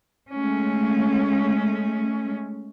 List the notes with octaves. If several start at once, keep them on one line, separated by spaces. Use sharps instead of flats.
G#3 A3 C#4